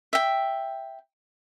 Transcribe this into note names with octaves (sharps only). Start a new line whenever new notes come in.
E5 G5